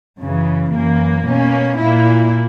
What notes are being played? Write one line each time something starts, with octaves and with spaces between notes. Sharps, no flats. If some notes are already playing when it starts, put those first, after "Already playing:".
F#2 C#3 E3
F#2 E3 A#3
B2 A#3 C#4
A#2 A#3 E4